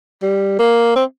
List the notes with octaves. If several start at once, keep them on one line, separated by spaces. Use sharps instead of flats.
G3
A#3
C4